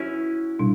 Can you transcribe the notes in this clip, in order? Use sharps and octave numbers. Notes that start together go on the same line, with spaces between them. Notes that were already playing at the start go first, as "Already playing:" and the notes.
Already playing: C#4 E4 F#4
B2 G3 D4